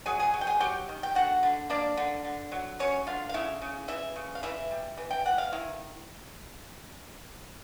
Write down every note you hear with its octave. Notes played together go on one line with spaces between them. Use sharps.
F#3 G#4 G#5
G#4 G#5
F#3
G5
G#4 G#5
F#3 G4 G5
D#3
G5
D3 F#4 F#5
D3
A#3 D4 D5
D3
D3
F#3
F#3 C#4 C#5
D3 F4 F5
F5
C#3 E4 E5
C#3
E3 E4 E5
C#3
F5
E3 E4 E5
G3
E3
G5
E3 F#5
F5
D#3 E4